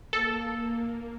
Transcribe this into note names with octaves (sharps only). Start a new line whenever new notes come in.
A#3 A4